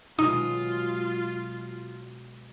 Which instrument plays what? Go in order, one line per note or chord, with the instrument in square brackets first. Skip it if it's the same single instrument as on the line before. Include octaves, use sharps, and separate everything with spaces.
[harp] B2 F#3 G#3 [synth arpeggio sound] D#4 [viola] F4 [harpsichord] D#6